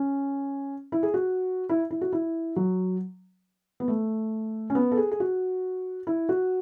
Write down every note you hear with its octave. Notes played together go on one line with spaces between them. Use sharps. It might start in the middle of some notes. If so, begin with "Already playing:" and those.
Already playing: C#4
E4
G#4
F#4
E4
E4
F#4
E4
F#3
B3
A3
C#4
B3
A4
G#4
G#4
F#4
E4
F#4